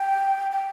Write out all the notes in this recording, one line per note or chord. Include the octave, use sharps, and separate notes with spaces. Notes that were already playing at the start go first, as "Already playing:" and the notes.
Already playing: G5
G5